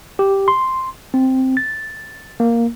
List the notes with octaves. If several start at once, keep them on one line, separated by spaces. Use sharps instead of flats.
G4
C6
C4
A6
A#3